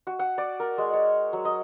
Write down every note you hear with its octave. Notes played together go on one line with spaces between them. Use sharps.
F#4
F#5
D5
A#4
G#3
C#5
F#3
D#5